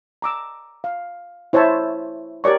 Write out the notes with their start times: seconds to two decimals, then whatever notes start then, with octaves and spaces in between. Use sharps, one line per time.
0.22 A#5 D6 E6
0.84 F5
1.53 E4 C5 C#5 E5 A5
2.44 G4 A#4 C#5 D5 C#6